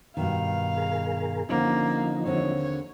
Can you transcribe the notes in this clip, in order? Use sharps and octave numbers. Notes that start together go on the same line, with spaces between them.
G2 B2 D#3 F5
G#4 A#4
D3 F3 A#3 C4 C#4 D#4
D#2 D3 C4 C#5